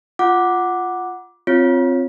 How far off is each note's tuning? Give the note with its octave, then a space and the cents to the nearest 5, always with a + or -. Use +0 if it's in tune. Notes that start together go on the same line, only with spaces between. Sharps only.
F4 +0 F#5 +0 D6 +0
C4 +0 F4 +0 C#5 -10